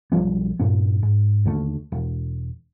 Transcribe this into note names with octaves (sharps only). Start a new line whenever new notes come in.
B1 F3 G3 B3
G2 A#2 B3
G#2
D#2 D3 A3
E1